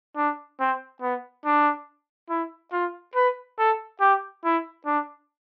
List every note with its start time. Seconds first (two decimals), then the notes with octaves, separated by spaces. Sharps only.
0.16 D4
0.60 C4
1.01 B3
1.45 D4
2.30 E4
2.72 F4
3.15 B4
3.58 A4
4.00 G4
4.44 E4
4.85 D4